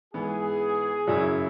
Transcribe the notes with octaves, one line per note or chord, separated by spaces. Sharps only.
G#2 E3 B3 G#4
F#2 C#3 F#3 C#4 E4